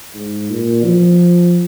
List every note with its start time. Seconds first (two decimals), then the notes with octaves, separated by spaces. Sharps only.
0.15 G#2
0.50 A#2
0.85 F3